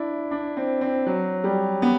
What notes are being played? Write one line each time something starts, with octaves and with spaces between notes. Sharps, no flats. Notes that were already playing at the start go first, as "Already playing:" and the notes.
Already playing: D4 E4
D4
C4
C4
F#3
G3
B3